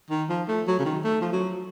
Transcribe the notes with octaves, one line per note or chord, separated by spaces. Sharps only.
D#3
F3
A3
F#3
C#3
D#3
A3
F3
F#3